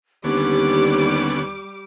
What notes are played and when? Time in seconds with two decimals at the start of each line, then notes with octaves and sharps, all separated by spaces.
0.24 D#2 D3 G3 B3 C#4 G4 D6